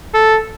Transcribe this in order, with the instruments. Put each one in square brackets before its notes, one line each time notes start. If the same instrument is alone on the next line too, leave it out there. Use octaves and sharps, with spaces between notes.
[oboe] A4